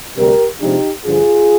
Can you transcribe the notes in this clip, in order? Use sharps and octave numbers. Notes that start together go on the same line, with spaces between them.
D2 C3 G3 D4 G4 A#4
C3 F3 G#3 D4 D#4 G4
G2 D3 F3 F4 G#4